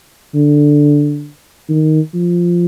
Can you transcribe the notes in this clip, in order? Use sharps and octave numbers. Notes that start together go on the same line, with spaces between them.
D3
D#3
F3